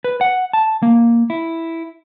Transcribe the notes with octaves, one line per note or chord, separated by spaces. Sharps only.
B4
F#5
A5
A#3
E4